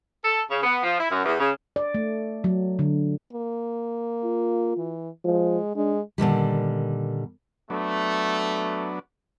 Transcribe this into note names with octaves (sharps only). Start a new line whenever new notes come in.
A4
C#3
B3
F3
E4
F#2
E2
C#3
D5
A3
F#3
D3
A#3
F4
E3
F3 G#3
G#3 D4
A#2 D3 D#3 G3
F#3 A3 B3 D4